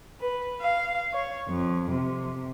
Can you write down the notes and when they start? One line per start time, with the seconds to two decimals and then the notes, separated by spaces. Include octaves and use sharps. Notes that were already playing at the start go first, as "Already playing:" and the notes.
0.20 B4
0.61 F5
1.13 C#5
1.48 F2
1.91 C3